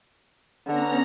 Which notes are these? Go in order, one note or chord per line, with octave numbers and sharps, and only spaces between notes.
D3 B3 C#4 A#5